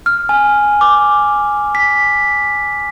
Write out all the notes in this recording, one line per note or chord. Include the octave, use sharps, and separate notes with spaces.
F6
G#5
D6
B6